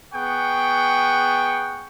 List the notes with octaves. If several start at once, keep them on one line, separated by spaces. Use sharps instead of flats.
B3 G#4 F#5 G5 C#6